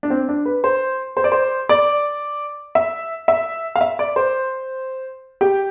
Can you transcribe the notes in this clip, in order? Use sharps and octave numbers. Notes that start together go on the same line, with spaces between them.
D4
C4
D4
B4
C5
C5
D5
C5
D5
E5
E5
F5
E5
D5
C5
G4